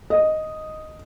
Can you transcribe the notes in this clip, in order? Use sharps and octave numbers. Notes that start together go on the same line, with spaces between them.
D#5